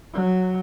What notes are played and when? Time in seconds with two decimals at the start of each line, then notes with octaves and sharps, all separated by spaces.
0.13 F#3